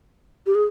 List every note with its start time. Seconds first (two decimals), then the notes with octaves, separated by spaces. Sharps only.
0.46 G4
0.55 G#4